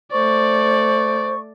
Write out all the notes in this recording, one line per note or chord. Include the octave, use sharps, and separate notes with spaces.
A3 C5 D5 C#6